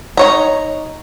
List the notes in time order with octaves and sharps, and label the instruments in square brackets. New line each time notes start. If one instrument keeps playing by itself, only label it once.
[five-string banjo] D#4 C#5 A#5